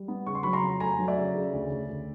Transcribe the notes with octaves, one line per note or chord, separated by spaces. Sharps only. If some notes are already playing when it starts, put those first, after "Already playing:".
Already playing: G3
B3
C#3 C#6
C6
F#3 B5 C#6
A#5 C6
F2
A3 G#5 A#5
F#3
D5 E5
C#3
C#3
D2
D2
D2